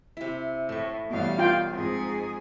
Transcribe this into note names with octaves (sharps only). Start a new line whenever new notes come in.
C3 E4
A2 A3 C#6
A1 B2 G3 F5
F4 G5
G#2 F3 C4 G#4